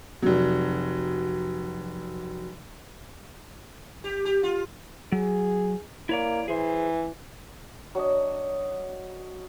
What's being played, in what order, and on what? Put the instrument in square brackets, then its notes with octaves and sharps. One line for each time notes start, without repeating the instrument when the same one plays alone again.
[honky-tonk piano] F1 F#3
[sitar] G4
G4
F4
[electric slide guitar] F#3 [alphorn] G#4
[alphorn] A#3 [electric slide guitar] E4 C#5 D5
[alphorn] E3 [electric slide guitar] G#4 C5
[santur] F#3 D4 D#5